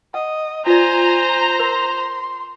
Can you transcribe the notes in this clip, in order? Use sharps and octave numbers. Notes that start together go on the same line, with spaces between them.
D#5 F#5
F4 C5 D5 G#5 A#5
A#4 C6